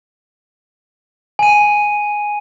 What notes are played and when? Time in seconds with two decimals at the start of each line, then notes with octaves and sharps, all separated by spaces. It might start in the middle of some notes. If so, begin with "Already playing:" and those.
1.39 G#5 D#7